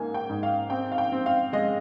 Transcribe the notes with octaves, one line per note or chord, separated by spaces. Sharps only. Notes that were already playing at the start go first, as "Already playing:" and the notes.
Already playing: G#2 A#3 G#5
G5
G#2
F5
C4 G5
F5
G5
C4
F5
G#3 D#5